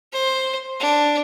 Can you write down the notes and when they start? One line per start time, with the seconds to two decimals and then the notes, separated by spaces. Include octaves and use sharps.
0.12 C5
0.80 D4